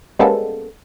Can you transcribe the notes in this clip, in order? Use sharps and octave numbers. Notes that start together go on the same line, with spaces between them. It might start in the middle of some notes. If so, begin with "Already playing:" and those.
G3 G#3 A#3 B3 C#4 A4